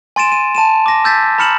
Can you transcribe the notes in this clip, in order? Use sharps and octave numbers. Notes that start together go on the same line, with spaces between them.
G#5 C6 A6 D7 E7
D#7
A5 D#7 E7
D6 A#6
E6 G6 A6 B6
A#5 B5 F6 C#7 E7 F#7